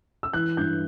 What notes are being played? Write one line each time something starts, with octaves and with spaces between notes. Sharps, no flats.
E6
E3 F#6
G2 G6